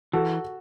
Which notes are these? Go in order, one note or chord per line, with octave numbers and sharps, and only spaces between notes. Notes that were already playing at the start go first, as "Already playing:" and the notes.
E3 F#4 A4